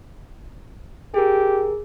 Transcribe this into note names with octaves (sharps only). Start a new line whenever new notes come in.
G4 G#4 A#4